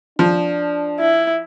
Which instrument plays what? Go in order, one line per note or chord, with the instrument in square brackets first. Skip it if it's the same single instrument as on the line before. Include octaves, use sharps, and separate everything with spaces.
[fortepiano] F3 [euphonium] D4
[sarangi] E4